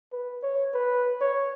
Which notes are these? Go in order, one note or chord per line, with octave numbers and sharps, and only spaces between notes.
B4
C#5
B4
C#5